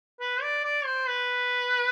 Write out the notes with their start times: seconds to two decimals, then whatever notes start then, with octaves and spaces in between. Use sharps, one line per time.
0.20 B4
0.42 D5
0.64 D5
0.85 C5
1.08 B4